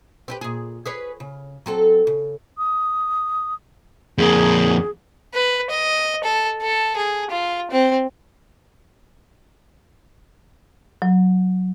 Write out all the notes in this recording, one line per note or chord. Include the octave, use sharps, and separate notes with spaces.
C4 G4 B4
A#2 G#4
G#4 B4 C#5
C#3
F#3 C4 A4
C#3
D#6
F2 A#3 G#4
B4
D#5
A4
A4
G#4
F4
C4
F#3